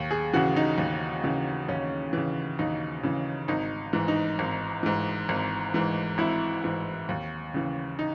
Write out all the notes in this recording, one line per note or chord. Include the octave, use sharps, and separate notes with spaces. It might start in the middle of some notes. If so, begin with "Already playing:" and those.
Already playing: D#2
G#4
C#3 E3 F#4
D#4
D#2
C#3 E3
D#2 C#4
C#3 E3
D#2 D#4
C#3 E3
G#1 D#4
G#2 E3
D#4
G#1
G#2 E3
G#1
G#2 E3
G#1 E4
G#2 E3
D#2
C#3 E3
D#4